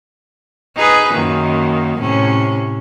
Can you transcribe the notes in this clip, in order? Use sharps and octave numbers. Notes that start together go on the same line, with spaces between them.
D#4 G#4 B4
F#2 D#3 A#3
A2 C3 C#4